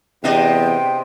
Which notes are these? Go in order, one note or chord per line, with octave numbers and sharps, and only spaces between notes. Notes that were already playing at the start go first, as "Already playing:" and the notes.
E2 C3 D4 D#5 G5